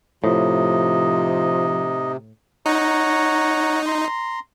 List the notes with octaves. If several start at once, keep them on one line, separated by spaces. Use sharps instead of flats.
A2 C3 F3 D#4 D#5
D#4 C#5 F#5 A#5
A#5 C6